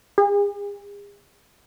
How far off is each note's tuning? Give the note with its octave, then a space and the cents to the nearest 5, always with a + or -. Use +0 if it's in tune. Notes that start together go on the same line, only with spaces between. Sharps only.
G#4 -45